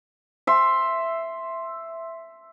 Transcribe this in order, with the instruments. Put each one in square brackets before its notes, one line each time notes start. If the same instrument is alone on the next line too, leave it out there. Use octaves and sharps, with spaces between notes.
[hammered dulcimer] E5 C6